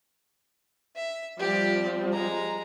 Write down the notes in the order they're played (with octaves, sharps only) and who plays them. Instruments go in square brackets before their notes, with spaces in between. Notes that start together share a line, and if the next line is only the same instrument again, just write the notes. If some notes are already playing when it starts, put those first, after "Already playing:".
[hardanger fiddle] E5
[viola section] F3 G3 C4 [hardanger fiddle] G4 D5
[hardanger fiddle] G#3 A#5